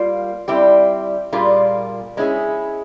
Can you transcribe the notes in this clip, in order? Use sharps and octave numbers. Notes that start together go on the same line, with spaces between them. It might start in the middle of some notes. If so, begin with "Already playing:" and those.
Already playing: G3 A#3 F4 C5
G3 C4 E4 G4
A#2 G3 A#3 F4 G#4
G#3 C#4 E4 G#4